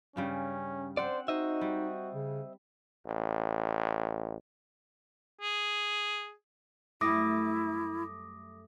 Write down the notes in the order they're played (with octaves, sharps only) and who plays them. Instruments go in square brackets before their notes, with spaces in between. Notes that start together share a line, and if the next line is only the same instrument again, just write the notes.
[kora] G2 C#3 G3 [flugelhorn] C#4
[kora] C4 F#5 [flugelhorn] C5 [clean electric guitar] D5
[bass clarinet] D#4 [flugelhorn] F#4 [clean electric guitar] C5 D#5 E5
[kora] G3
[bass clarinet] C#3
[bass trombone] A1
[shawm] G#4
[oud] F#2 G3 A3 [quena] E4 [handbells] D6 D#6 A#6